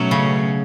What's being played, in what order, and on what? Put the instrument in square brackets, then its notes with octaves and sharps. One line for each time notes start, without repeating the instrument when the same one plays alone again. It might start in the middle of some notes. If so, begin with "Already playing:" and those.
Already playing: [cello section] B2 A3 C#4 [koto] F#3
[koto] C#3